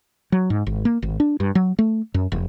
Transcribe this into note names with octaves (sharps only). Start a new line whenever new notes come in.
F#3
G#2
G#1
A#3
G#1
D4
G2
F#3
A3
F#2
F1